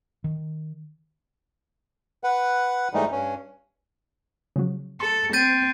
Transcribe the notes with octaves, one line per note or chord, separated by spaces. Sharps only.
D#3
B4 F#5
G#2 E3 G3 A3 D#4
G2 C#4
C#3 F3 F#3
A4 C6
C4 G6 A6 D#7